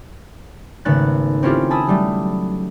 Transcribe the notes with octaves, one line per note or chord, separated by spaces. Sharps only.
G#1 C#3 A3 B3 F#6 A6
C4 C#4 E4 F4 G4 A4
G#5 A5 B5 D#6 E6
F#3 G3 A3